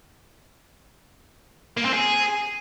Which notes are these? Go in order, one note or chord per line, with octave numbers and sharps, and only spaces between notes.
A#3
C4
G#4